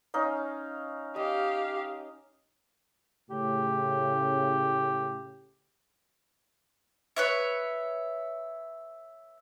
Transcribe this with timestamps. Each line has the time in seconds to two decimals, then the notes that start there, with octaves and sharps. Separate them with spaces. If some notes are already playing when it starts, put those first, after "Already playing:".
0.14 C#4 D#4 F5
1.16 G4 D#5 F5
3.30 A2 C#3 G4
7.16 B4 C#5 E5